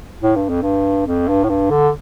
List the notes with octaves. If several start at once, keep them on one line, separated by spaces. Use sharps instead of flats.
A2
G2
F2
G2
F2
G2
A2
G2
D3